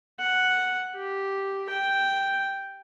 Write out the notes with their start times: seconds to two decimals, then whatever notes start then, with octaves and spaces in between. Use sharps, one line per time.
0.19 F#5
0.95 G4
1.69 G5